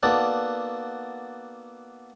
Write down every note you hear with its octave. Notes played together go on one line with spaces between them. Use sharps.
A#3 B3 D#4 F#4 A4 D5